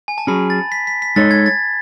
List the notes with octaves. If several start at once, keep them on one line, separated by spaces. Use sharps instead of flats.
G#5
A5
F#3 C#4 G#4 B5
A6
B6
B6
B6
G#3 D#4 A4 C#5 A6
G#6
A6